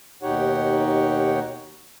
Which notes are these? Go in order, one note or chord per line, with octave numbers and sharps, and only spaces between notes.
D#2 B2 D#4 G4 C#5 F#5